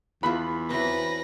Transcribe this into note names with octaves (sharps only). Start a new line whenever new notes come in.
E2 F4 E5 F#5 B5
E3 F#3 C4 B4 A#6